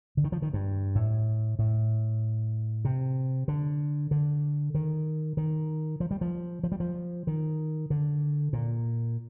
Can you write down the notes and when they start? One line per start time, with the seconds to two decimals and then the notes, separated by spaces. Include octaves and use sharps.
0.17 D3
0.24 D#3
0.32 F3
0.42 D#3
0.53 G2
0.95 A2
1.59 A2
2.85 C3
3.48 D3
4.11 D3
4.74 D#3
5.37 D#3
6.00 F3
6.11 G3
6.21 F3
6.63 F3
6.72 G3
6.80 F3
7.27 D#3
7.90 D3
8.53 A#2